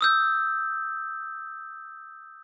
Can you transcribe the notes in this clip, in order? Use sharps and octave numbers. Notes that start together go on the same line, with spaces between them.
D#6 E6 G6